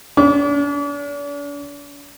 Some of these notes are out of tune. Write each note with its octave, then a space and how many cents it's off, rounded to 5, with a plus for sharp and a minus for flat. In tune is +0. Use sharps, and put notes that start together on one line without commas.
D4 -45 D6 -40